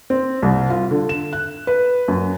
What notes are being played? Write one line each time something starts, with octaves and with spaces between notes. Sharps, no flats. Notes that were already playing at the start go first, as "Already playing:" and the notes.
C4
C2
F4
D3
E7
F#6
B4
F#2